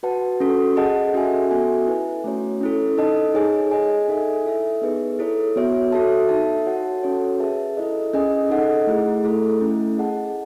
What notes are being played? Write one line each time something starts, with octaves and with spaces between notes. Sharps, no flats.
F#4 B4 F#5 A5
C#4 F#4 A4
G#4 D#5 F#5 A5
C#4 F#4 A4 E5 G#5
B3 F#4 A4 E5 G#5
E4 B4 E5 G#5
A3 C#4 F#4 C#5
C#4 E4 A4
D#4 A4 D#5 A5
D#4 G#4 C#5 G#5
G#4 D#5 G#5
D#4 A4 E5 G#5
E4 A4 E5
B3 D#4 G#4 B4
E4 A4 C#5
B3 F#4 C#5 E5
F#4 A4 E5 A5
D#4 A4 E5 A5
F#4 C#5 F#5 A5
C#4 F#4 A4 C#5
G#4 B4 E5 A5
E4 A4 D#5
C#4 G#4 D#5 G#5
D#4 A4 D#5 F#5
A3 E4 G#4
A3 E4 A4
A3 C#4 E4
G#4 D#5 F#5 A5